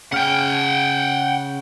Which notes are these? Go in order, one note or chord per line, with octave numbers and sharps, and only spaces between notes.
C#3 F#5 G5 F6